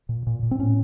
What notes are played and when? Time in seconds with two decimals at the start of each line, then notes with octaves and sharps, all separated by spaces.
0.09 A#2
0.27 A#2
0.43 A#2
0.51 C4
0.59 A2 C#4